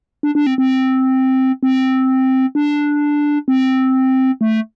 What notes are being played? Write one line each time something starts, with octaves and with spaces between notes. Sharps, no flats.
D4
D4
C4
C4
C4
D4
C4
A3